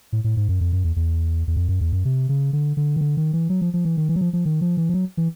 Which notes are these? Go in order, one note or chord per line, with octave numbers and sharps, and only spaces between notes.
A2
A2
G#2
F#2
F2
F#2
E2
E2
E2
F2
F#2
E2
F#2
C3
C#3
D3
D3
D#3
D3
D#3
E3
F#3
F3
F3
E3
D#3
E3
F#3
F3
F3
D#3
F3
E3
F3
F#3
E3